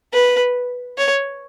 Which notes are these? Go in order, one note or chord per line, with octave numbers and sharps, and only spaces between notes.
B4
C#5